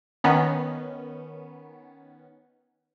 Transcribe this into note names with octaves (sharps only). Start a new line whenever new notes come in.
D#3 B3 C#4